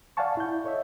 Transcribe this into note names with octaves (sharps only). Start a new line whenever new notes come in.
D5 F5 F#5 G#5 A5 C#6
E4 G6
A4 C#5 D#5 E5